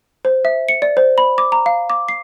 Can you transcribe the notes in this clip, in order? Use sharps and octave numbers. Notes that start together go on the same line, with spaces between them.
C5
E5
C#7
D5
C5
B5
D6
A#5
F5
D6
C7